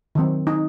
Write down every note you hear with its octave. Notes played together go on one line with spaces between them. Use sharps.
D#3 F#3 C4
D#4